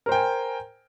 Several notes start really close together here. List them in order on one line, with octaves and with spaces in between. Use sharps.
A#4 C5 G5 G#5